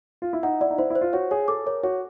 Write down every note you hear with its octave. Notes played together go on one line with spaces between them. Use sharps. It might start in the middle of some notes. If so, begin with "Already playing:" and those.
F4
E4
D#4 F#5
E4 D5
D#4
E4 C5
E4
C5
F4
F#4 C#5
G#4 C#5
A4 D6
A#4 C#5
F#4 C#5